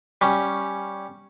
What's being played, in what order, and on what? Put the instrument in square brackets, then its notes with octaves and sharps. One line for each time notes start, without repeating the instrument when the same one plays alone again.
[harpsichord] G3 C#4